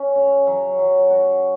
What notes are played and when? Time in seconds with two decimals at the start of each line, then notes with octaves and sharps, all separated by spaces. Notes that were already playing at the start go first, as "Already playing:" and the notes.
Already playing: C#4
0.15 C#3
0.47 F#3
0.79 F#3
1.10 F#4